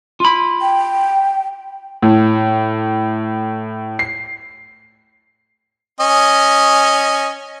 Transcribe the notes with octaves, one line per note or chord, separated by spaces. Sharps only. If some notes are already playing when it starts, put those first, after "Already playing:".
F4 B5
G5
A2
C7
C#4 D#5